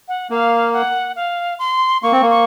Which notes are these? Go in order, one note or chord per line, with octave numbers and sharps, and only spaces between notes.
F#5
A#3 F5
F#5
F5
C6
A#3 C#6
C4
A#3
C#6